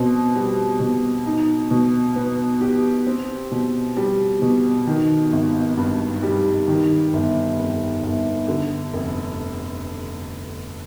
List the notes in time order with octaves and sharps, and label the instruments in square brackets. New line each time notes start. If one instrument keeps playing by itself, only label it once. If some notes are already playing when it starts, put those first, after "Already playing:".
Already playing: [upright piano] B2 C4
G3
B2
D#4
B2
B3
G4
C4
B2
G3
B2
D#3
G#1
G2
G3
D#3
G1
F2
G1
D3
F1